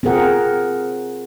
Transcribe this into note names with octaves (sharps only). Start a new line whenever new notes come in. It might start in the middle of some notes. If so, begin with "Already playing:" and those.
C4 F4 G#4 A#4 F#5